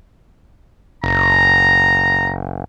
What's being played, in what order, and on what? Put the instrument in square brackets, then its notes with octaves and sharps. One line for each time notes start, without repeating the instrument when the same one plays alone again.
[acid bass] F#1 [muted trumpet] A#5